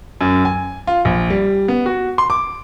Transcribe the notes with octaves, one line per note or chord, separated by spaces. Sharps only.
F#2
G#5
F4
A#1
G3
B3
F#4
C6
D6